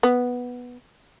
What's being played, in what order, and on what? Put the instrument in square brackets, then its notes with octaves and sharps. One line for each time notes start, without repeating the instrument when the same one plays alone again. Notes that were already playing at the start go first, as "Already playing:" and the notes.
[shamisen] B3